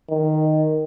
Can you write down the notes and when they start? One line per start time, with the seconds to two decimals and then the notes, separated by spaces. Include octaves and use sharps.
0.10 D#3